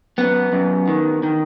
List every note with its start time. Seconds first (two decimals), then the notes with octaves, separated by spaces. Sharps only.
0.18 F#2 B3
0.53 F#2
0.88 D#3
1.23 D#3